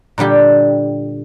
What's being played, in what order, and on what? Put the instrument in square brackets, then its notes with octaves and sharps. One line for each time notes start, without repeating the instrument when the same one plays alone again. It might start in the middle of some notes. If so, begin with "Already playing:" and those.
[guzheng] A#2 D3 G3 G4